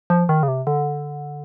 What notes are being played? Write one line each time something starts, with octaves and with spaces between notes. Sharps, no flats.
F3
D#3
C#3
C3
D3